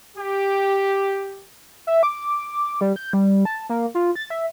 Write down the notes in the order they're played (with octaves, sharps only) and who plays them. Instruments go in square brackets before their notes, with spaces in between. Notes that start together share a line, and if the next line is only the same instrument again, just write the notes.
[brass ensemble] G4
[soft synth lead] E5
D6
G3
G6
G3
A5
A#3
F4
A6
E5